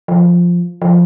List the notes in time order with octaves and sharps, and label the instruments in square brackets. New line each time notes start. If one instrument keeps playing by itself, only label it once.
[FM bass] F3
F3